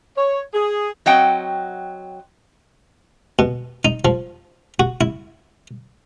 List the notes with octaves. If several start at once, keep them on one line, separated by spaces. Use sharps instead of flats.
C#5
G#4
F#3 C4 D#5 F#5 G5
B2
D#4
F3
F#4
E4